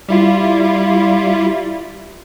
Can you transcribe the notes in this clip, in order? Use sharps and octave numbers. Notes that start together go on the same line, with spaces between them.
G3 E4 F4